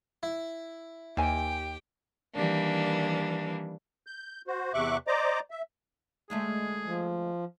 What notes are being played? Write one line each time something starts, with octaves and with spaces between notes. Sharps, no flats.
E4
D#2 G4 C5 G5 G#5
D#3 E3 G3 A#3 D4
G6
F#4 C5
E2 C3 E5 C#6 D6 F#6
C5 D5 D#5 A#5 D6
E5
D2 G#3 A3 G#4
F3